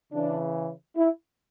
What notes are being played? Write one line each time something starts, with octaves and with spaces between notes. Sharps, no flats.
C#3 E3 D4
E4